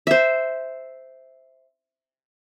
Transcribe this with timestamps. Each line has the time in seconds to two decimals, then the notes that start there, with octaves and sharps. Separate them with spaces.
0.07 C5 E5